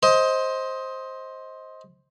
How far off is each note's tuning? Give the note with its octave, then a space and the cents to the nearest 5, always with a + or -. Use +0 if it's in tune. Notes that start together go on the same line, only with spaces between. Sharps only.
C5 +10 D#5 +20